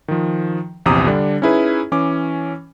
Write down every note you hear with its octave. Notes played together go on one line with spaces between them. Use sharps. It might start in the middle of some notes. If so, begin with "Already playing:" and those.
D#3 F3
A#1 E2 C3 A#5 D6 D#6
D3 G3 D4
C#4 D#4 E4 G#4 B4
E3 C#4 D6